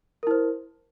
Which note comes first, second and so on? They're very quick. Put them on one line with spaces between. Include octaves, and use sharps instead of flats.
A#4 E4 C5